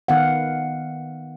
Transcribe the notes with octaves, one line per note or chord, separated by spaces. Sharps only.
D#3 B3 F5 F#5